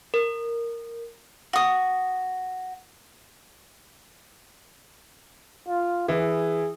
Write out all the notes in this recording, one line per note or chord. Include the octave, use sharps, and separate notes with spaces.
A#4
F#4 D#6
F4
E3 G#4